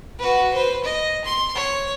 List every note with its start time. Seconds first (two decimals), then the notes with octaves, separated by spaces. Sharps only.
0.19 F#4 B4
0.54 B4 C5
0.84 D#5
1.25 C6
1.55 C#5